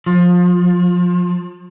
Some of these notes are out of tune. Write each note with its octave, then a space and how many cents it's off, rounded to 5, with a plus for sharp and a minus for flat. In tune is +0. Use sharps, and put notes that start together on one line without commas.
F3 +30